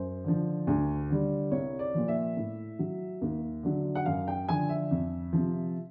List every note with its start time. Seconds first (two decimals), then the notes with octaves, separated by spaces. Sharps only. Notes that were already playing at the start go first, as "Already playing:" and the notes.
Already playing: F#2 C5
0.24 D3 F3
0.67 D2
1.10 D3 G3
1.51 C2 C#5
1.79 D5
1.94 A#2 F3
2.08 E5
2.37 A2
2.79 F#3
3.22 D#2
3.63 D3 F#3
3.95 F#5
4.06 F#2 F5
4.28 G5
4.49 D3 F3 G#5
4.69 E5
4.91 F2
5.33 C3 F3